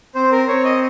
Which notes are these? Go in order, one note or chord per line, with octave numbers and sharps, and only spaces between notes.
C4 C5
A#4
C4 C#5
D#5